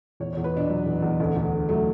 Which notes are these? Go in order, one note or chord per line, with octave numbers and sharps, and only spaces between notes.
E2 C#5
C#5
E2
B4
B2 D4
F#3
E2
E2
D2
D2
D3
F#3 A3